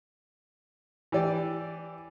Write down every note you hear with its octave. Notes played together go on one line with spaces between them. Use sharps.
E3 G4 D5